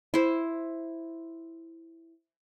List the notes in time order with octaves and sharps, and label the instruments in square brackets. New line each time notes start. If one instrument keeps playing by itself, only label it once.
[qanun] E4 C5